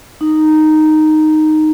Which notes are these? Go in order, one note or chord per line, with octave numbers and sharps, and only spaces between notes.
D#4